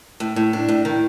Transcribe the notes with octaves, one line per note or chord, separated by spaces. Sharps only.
A2
A2
D4
A2
D#3